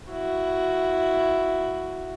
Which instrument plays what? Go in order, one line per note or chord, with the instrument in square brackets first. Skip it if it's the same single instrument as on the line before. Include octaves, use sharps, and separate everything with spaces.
[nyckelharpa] E4 F#4